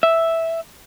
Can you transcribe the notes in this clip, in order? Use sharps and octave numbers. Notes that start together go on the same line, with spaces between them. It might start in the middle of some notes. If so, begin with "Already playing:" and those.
E5